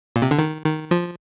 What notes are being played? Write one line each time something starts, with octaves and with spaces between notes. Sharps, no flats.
A#2
C3
D3
D#3
D#3
F3